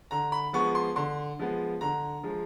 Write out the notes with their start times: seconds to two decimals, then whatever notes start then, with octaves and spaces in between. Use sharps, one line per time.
0.11 D3 A#5
0.32 B5
0.53 F3 G#3 B3 C#6
0.75 C6
0.96 D3 C6
1.39 F3 G#3 B3
1.81 D3 A#5
2.23 F3 G#3